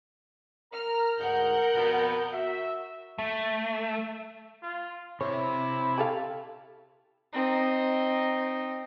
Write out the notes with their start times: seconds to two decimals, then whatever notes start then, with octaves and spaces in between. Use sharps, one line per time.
0.73 A#4 A#5 F6
1.19 D2 G#2 D#4 A#4 F#5 G6
1.74 F2 B2 B3
2.32 F#4 E5
3.18 A3
4.63 F4
5.21 C3 E4 C5 C#5 E5
5.98 G4 A4 F5
7.33 C4 D#4